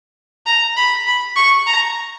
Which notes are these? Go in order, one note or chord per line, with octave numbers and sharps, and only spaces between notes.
A#5
B5
B5
C#6
A#5